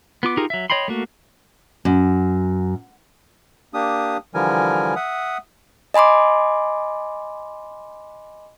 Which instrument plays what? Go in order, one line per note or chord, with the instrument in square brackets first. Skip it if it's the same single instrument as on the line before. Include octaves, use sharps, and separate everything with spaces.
[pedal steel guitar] B3 F4 D6
D#4 F4 G4 G#4 A#4
F#3 E5
C#5 D#5 G5 B5 C6
A3 A#3 F#4
[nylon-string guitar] F#2
[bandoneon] A#3 D4 G4 D#6
D3 E3 F3 G3 A#4 G#5
E5 F#5 D#6
[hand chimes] D#5 G#5 B5 C6 D6